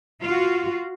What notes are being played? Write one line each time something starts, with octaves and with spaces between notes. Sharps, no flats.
F4 F#4